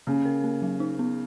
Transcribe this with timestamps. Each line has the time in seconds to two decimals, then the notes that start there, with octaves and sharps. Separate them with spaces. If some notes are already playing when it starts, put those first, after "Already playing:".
0.07 C#3 A#3
0.25 A#4
0.44 A#3
0.62 F#3
0.80 D#4
0.99 B3